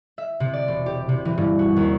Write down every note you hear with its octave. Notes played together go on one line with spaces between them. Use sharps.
E5
C3
D5
E1
G4
C3
E3
G2
F#4
D#2